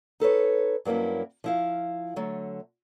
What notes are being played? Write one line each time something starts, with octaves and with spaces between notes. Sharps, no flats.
D#4 A4 B4 C#5
G2 F#3 A#3 C#4 E4
F3 E4 F5
D3 F#3 A3